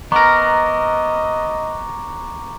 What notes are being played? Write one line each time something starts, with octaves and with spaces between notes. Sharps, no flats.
B3 A#4 D#5 A#5 C#6 D6